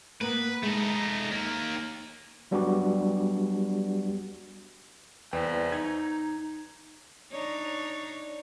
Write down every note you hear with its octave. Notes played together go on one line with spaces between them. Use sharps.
A#3 B3 B4
G#3 A3 D#4
D#2 A#3
F#3 G3 B3 D4 F#4 G4
E2 B4 C5 D5 G5
D#4 G#6
D4 D#4 C#5